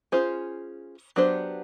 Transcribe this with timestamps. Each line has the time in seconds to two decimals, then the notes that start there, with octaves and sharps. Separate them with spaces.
0.12 C#4 F4 G#4 C5
1.16 F#3 B3 D4 G4 C5